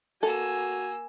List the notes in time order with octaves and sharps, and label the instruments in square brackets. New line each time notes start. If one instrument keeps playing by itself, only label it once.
[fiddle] A#3 E6 [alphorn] F#4 [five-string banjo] A4 [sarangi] G#5